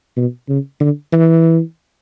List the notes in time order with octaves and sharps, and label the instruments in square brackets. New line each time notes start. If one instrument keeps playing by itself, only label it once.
[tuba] B2
C#3
D3
E3